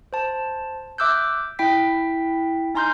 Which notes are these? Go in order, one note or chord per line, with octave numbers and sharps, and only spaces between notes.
C5 A5
E5 D6 E6 F#6 G6
E4 G5 B6
D#4 G#5 A#5 C6 F6 G6